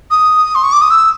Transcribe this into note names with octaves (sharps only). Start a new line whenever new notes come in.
D#6
C6
C#6
D6
D#6
E6